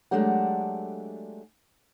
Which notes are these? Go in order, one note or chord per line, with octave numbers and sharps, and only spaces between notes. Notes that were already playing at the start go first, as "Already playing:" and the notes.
F#3 G#3 A3 D4 G4 F#5